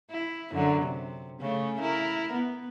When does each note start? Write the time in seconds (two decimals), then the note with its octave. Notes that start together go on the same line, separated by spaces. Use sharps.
0.11 E4
0.52 F#2 D3 F#3
0.82 C3
1.41 C#3 A3 C#4
1.80 E4 A#4
2.33 B3